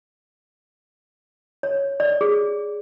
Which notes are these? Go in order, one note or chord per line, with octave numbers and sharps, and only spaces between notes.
C#5
D5
G#4